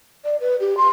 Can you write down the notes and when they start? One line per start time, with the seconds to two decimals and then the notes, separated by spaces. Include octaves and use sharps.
0.24 D5
0.40 B4
0.60 G4
0.77 C6